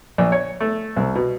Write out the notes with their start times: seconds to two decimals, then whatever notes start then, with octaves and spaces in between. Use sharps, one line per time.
0.18 A#1
0.32 C#5
0.61 A3
0.96 C2
1.15 B2